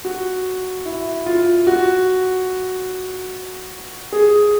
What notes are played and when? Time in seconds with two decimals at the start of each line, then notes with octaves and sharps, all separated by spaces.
0.05 F#4
0.86 E4
1.26 F4
1.67 F#4
4.13 G#4